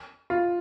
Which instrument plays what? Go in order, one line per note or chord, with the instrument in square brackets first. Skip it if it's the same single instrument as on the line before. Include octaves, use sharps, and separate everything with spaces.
[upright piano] F4